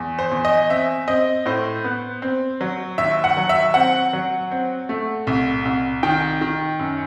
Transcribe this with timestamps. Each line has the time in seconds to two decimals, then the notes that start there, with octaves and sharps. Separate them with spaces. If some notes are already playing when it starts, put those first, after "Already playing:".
Already playing: E2
0.19 C5
0.31 E2
0.45 D#5
0.70 C4 E5
1.08 C4 D#5
1.46 A2 C5
1.84 B3
2.22 C4
2.61 F#3
2.98 D#2 E5
3.24 F#5
3.37 F#3
3.49 E5
3.74 C4 F#5
4.13 F#3
4.51 C4
4.89 A3
5.27 C2
5.65 C2
6.03 D#3 G5
6.41 D#3
6.79 F#2